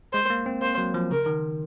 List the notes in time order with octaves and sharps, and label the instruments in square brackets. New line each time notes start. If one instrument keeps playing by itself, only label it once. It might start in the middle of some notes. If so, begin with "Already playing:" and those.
[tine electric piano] G#3 [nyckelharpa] C5
[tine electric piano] A#3
C4
[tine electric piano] A#3 [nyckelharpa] C5
[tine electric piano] F#3
F3
[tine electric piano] C#3 [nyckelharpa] A#4
[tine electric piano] D#3